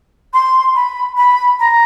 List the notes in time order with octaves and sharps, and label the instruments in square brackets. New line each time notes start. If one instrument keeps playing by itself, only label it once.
[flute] C6
B5
B5
A#5